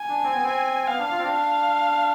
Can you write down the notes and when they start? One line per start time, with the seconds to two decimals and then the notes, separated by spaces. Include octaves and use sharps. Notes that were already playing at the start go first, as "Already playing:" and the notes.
Already playing: G#5
0.09 D4
0.24 C4
0.34 B3
0.43 C4
0.88 B3 F5
0.99 D4
1.12 F4
1.19 C4
1.23 D4
1.34 F5